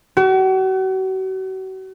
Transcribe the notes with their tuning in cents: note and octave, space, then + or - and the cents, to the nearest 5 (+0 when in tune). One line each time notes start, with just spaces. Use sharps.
F#4 +40